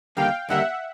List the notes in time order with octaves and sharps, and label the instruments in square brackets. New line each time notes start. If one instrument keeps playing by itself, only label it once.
[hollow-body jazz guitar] D#2 D3 G3 A#3 [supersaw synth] F5 G5
[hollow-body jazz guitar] D#2 D3 G3 A#3 [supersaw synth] E5 F#5